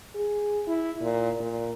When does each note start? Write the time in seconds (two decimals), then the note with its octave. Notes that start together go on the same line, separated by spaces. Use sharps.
0.15 G#4
0.67 E4
1.01 A#2
1.40 A#2